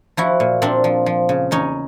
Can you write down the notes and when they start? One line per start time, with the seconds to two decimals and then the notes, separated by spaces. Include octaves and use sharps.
0.17 F3 E4 F#4
0.40 A#2
0.62 A#2 C4 D4
0.84 F3
1.06 F3
1.29 C#3
1.51 E2 C#4 D#4